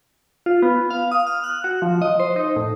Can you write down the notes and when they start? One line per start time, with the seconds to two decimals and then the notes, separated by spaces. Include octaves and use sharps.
0.46 F4
0.62 B3
0.90 F5
1.12 D#6
1.27 F6
1.44 F#6
1.64 F#4
1.82 F3
2.02 D#5
2.20 C5
2.36 D#4
2.56 A2